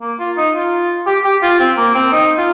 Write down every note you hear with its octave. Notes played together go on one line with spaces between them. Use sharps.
A#3
F4
D#4
F4
G4
G4
F4
C4
A#3
C4
D#4
F4